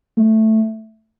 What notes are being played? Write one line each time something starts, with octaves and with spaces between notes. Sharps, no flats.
A3